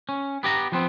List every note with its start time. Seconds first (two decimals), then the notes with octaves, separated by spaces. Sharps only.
0.09 C#4
0.43 B3 G4 D5 A#5
0.72 F3 B3 C4